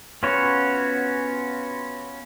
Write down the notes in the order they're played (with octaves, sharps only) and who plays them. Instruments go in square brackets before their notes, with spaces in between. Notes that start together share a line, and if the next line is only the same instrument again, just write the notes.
[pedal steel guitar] B3 C#4 F4 F#4 C#5